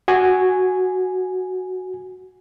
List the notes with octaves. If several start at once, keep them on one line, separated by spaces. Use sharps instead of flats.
F#4 G#5